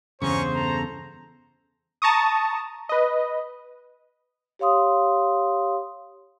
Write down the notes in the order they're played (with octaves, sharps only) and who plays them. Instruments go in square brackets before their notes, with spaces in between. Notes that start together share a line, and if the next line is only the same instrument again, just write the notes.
[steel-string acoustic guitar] E2 G2 C#3 [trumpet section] C#4 A#5 C#6 [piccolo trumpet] C5
[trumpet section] A4 A#5
[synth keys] A5 A#5 C#6 D#6
B4 D#5
[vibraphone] G4 C#5 F5 C6 D#6